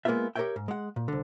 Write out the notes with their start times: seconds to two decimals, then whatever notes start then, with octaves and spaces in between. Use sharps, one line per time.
0.05 G#3 A#3 B3 D#4 F4 E5
0.36 G4 A#4 C5 C#5 E5 G5
0.56 G#2
0.68 G#3 F#5
0.96 A#2
1.08 C2 D3